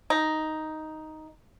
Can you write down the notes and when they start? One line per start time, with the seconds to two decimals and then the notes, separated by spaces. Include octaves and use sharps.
0.10 D#4